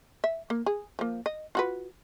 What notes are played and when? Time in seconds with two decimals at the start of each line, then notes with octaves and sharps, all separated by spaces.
0.24 E5
0.50 A#3
0.66 G#4
0.99 F3 A#3
1.26 D#5
1.55 F4 F#4 B4